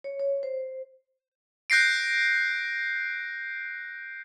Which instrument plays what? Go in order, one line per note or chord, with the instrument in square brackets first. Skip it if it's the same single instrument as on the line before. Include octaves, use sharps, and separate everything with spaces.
[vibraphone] C#5
C#5
C5
[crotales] F#6 G6 A#6 C7 D7